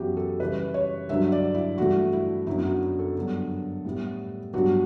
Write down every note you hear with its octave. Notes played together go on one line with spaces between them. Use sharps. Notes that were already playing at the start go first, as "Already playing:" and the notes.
Already playing: F#2 E3 B3 F#4 G4
A4
C#3 E3 G3 B4
C#5
G2 D3 F#3 E5
D5
E4
G2 E3 A3 F#4
E4
F#2 D3 F#3 B3 E4
E4
F#4
A4
G2 D3 F#3 B3
A2 G3 B3
G2 F#3 B3 F#4